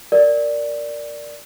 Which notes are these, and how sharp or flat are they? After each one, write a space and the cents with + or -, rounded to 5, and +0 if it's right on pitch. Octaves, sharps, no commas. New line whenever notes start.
A#4 +0 D5 +0